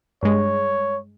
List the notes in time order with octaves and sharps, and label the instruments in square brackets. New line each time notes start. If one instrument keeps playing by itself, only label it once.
[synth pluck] G2 G#3 [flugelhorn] C#5